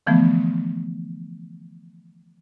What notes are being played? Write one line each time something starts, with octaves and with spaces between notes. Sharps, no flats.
D3 E3 F3 A3 B3